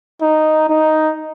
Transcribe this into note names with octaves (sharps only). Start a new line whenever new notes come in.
D#4
D#4